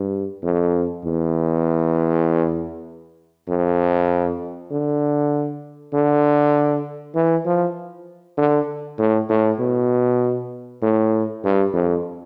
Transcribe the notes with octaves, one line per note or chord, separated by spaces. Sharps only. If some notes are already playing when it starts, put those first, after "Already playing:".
Already playing: G2
F2
E2
F2
D3
D3
E3
F3
D3
A2
A2
B2
A2
G2
F2